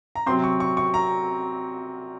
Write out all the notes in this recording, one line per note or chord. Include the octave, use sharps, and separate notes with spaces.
A#5
C3 F#3 C4 C6
C#6
C#6
C#6
A#5